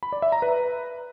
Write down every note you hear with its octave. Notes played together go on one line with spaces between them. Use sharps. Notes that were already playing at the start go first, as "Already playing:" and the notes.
B5
D5
E5
A#5
B4